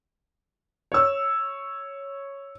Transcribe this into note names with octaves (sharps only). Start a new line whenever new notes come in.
C#5 E6